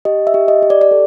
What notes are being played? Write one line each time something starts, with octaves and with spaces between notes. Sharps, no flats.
G4 D#5
E5
G4
D#5
G4
D5
D5
A4